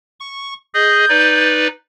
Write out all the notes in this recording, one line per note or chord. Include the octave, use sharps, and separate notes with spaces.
C#6
G#4 D#5 G6
D#4 B4 D5